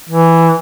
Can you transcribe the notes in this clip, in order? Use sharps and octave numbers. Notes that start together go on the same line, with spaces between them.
E3